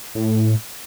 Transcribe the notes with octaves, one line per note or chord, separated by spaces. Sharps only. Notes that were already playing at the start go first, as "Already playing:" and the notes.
A2